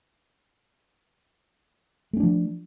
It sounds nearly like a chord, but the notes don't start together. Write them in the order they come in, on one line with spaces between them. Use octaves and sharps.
A3 C#4 D4 F3